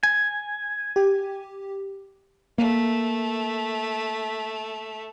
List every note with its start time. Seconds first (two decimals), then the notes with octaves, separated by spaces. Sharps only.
0.03 G#5
0.96 G4
2.58 A3 A#3